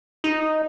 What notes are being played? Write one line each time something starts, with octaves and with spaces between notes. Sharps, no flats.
D#4